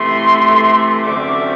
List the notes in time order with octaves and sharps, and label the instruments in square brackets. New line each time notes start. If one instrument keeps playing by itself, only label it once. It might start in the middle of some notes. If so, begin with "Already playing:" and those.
Already playing: [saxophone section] C3 E3 A3 [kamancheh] C6
[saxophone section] F#2 D3 A3 C4 [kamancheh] D6